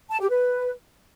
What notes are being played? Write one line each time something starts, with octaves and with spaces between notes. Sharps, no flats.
A5
G4
B4